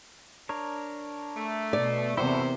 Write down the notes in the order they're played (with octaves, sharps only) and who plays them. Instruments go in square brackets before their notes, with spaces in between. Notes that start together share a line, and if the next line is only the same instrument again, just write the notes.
[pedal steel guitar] D4 A#4 C#5
[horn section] A3
[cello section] B2 [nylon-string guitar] D5
[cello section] E2 C3 [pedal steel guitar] E4 F#4 A4 [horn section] G4 A#4 C5